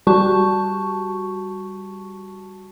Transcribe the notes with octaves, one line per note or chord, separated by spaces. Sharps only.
G3 F#4 G4 A5 C#6